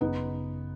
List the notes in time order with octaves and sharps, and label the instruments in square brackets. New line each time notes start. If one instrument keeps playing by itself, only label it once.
[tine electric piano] G#1 F#2 C#3 [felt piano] B3 D#4